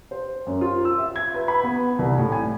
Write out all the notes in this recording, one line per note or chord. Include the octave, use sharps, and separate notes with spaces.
C5
F#2
F4
E6
E5
G#6
B4
B5
B3
C2
A2
G#5